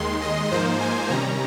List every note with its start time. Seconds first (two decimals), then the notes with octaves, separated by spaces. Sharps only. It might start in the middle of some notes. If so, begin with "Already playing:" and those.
Already playing: D#2 D#3 G#3 C6
0.22 D#5
0.52 G#2 F3 A#3 D#4 C5
0.81 G#5
1.10 C3 D#3 G3 C#4 A#5